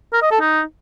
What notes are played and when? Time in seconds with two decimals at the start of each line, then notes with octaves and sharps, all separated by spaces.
0.13 A#4
0.22 D#5
0.31 A4
0.40 D#4